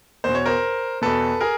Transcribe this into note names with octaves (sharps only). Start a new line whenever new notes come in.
E2 B2 C5
C#5
A#4 C5
E2 B2 A4 B4
G#4 A#4